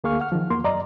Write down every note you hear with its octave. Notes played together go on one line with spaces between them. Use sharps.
D2 A#3 G#4 F5 C#6 F6
F#5 F6
D#3 F3
E2 A#3 C6
F#2 D5 D#5 A#5